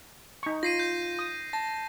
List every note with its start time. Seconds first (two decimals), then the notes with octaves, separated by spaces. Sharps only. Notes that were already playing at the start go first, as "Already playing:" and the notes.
0.43 D#4 C#6
0.63 F4 A#6 C7 D#7
0.79 G6
1.19 D#6
1.53 A5 A#6